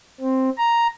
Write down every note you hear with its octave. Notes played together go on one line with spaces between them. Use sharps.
C4
A#5